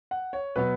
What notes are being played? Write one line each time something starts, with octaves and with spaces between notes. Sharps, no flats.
F#5
C#5
B2 F#3 B3 B4